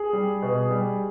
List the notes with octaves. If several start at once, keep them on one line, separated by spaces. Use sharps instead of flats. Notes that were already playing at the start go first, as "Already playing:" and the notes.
Already playing: G#4
G3
B2
G3